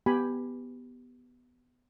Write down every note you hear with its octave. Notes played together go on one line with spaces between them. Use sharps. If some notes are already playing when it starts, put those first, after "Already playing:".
B3 G4 G#5 B5